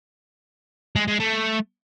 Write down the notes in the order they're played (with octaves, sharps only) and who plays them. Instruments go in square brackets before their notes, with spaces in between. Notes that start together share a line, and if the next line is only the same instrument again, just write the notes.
[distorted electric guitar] G#3
G#3
A3